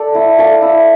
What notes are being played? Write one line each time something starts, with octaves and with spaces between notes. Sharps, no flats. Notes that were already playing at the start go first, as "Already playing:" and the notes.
Already playing: A4 D5
E4
A4 D5 F5
E4